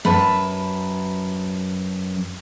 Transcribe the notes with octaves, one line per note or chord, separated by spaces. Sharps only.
F#2 B4 A5